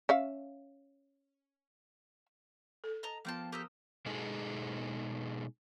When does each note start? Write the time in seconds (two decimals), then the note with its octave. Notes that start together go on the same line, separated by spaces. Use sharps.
0.09 C#4 E5 F5
2.84 A4
3.03 D#5 A5 A#5
3.25 F3 A#3 B3 F4 G5 A5
3.52 G4 A4 A#4 D#6 E6 G6
4.06 B2 G#3 D#4 G#4 A4